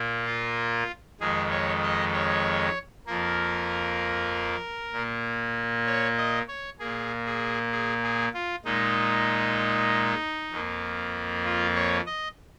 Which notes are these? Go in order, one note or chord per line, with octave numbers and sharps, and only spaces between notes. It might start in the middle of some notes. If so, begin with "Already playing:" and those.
Already playing: A#2 A#3
F4
F2 D#3 G#3 G#4
C#5
D#5
C#5
F2 F3 A#3 A#4
A#2 A#3
C#5
D#5
C#5
A#2 A#3 G#4
G#4
G#4
G#4
F4
A#2 G#3 D#4
F2 F3 A#3
F4
C#5
D#5